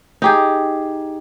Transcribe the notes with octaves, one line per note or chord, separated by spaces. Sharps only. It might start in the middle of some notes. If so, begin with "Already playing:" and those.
D#4 G4 G#4